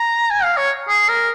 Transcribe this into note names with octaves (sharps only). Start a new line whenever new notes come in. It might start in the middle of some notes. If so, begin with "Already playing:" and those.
Already playing: A#5
G#5
F5
C#5
G#4
A#4